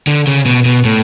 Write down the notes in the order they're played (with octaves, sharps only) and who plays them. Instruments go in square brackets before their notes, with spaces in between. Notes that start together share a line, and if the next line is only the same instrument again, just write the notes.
[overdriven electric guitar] D3
C#3
B2
B2
A2